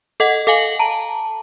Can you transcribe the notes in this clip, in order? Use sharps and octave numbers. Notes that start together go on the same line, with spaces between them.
A4 D#5 F#5
A4 F5 G#5 F#7
A5 A#5